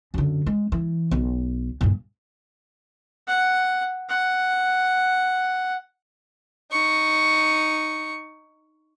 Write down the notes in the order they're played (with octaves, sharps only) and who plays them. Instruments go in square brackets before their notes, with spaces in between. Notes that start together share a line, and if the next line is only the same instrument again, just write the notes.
[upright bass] F#2 D3
G#3
E3
B1
G2 A#2
[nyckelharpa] F#5
F#5
[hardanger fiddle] D#4 C#6